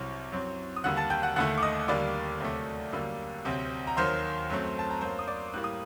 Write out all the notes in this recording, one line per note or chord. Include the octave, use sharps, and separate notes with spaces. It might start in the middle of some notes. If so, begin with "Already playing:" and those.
Already playing: C2 C3 F#3 C4
F#2 F#3 C4
D#6
D#2 D3 G3 A#3 F#5 F#6
A5 A6
G5 G6
F#5 F#6
D#2 D3 A3 F#5 F#6
D6
D#5 D#6
D#2 D3 G3 A#3 D5 D6
D2 C3 F#3 A3
F#2 D3 G3 A#3
D2 C3 F#3 C4
A#5
D#2 D#3 F#3 C5 C6
F#2 F#3 A3 C4
A5
A#5
F#2 F#3 A#3 C5 C6
D#6
D5 D6
A2 G3 A#3 F#6
D#6